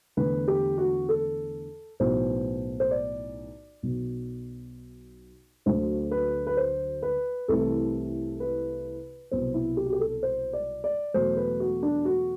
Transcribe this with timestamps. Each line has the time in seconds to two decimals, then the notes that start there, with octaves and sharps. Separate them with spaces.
0.17 E2 D3 A3 B4
0.48 G4
0.78 F#4
1.09 A4
2.00 B1 A2 E3 C5
2.80 C5
2.91 D5
3.83 B1 B2 F#3
5.66 D2 D3 F#3 A3 C5
6.11 B4
6.47 B4
6.57 C5
7.03 B4
7.48 C2 C3 E3 A3 A4
8.40 B4
9.31 C2 B2 F#3 B3 C5
9.54 E4
9.77 G4
9.86 F#4
9.93 G4
10.00 A4
10.23 C5
10.53 D5
10.84 D5
11.14 E2 B2 F#3 A3 C5
11.37 B4
11.60 F#4
11.83 D4
12.05 F#4